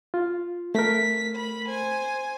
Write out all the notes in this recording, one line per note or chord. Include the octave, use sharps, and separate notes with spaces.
F4
A3 A#4 B6
B5
C5 G#5